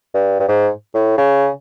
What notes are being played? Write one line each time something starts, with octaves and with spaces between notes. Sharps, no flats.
G2
G2
G#2
A2
C#3